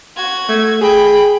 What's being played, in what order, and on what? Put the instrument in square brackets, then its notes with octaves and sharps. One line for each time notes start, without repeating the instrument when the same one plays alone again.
[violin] F#4 G#6
[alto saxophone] A3
[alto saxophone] G#4 [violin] G5 B5